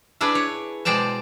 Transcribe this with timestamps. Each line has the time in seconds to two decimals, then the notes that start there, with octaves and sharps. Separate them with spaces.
0.21 D4 E4 G#4 B4 D5
0.35 C#5
0.85 B2 G#3 C5 D5 G5 A5